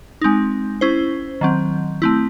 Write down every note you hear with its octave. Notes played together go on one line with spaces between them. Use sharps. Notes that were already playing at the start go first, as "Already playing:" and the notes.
G#3 C4 D#4
C#4 E4 C5
D#3 F#3 C4
A3 C4 E4